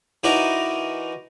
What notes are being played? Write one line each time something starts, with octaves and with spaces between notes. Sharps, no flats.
E3 D#4 F#4 A#4 D5